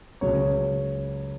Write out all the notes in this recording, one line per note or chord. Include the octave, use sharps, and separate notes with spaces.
C#2 C#3 F#3 C#5